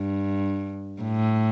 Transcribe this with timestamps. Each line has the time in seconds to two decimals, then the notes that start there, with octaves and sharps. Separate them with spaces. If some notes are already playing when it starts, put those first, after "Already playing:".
Already playing: G2
1.02 A2